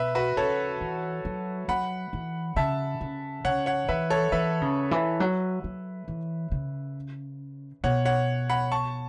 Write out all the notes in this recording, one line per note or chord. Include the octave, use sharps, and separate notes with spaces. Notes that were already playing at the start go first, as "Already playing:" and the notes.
Already playing: B2 B4 E5
F#4 B4
C#3 A4 C#5
E3
F#3
F#3 F#5 B5
E3
C#3 E5 A5
C#3
C#3 C#5 F#5
C#5 F#5
E3 B4 E5
A4 C#5
E3 B4 E5
C#3
E3
F#3
F#3
E3
C#3
B2 C#5 F#5
C#5 F#5
F#5 B5
A5 C#6